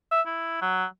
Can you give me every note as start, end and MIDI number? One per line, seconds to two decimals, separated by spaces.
0.12 0.21 76
0.26 0.61 64
0.62 0.85 54